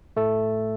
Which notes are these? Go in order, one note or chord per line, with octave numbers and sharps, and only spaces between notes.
A2 A3 A4